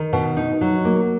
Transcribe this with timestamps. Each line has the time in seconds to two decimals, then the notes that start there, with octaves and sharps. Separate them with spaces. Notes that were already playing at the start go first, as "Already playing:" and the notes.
Already playing: D#3
0.13 B2
0.37 D#4
0.61 F#3
0.85 A#3